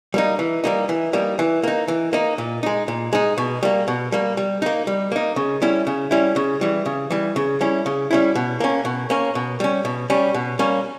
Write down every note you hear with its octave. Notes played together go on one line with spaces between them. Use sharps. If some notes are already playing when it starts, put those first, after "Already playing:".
G3 A#3 D#4
E3
G3 A#3 D#4
E3
G3 A#3 D#4
E3
A#3 D#4
E3
A#3 D#4
A#2
G#3 D#4
A#2
G#3 D#4
B2
G3 A#3
B2
G3 A#3
G3
A#3 D#4
G3
A#3 D#4
C#3
G3 C#4 E4
C#3
G3 C#4 E4
C#3
E3 G3
C#3
E3 G3
C#3
G3 C#4 E4
C#3
G3 C#4 E4
B2
A#3 C#4
B2
A#3 C#4
B2
G3 C#4
B2
G3 C#4
B2
G3 A#3 C#4